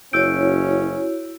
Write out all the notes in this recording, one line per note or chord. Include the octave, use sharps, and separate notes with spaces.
F#1 C#4 E4 F#4 C#5 E6 G6 D7